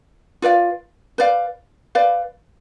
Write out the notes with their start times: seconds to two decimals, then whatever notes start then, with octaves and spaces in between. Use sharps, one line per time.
0.42 F4 B4 D5 F5
1.18 B4 D5 F5
1.95 B4 D5 F5